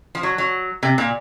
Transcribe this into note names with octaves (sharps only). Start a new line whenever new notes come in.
F3
F#3
F#3
C3
A#2